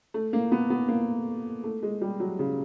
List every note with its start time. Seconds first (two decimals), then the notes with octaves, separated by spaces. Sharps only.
0.14 A3
0.33 A#3
0.52 B3
0.70 B3
0.88 A#3
1.64 A3
1.83 G#3
2.02 G3
2.20 F#3
2.39 C#3